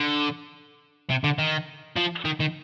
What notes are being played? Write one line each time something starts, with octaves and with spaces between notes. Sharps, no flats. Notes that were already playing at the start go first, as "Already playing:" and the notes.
Already playing: D3
C3
D3
D#3
F3
D#3
D#3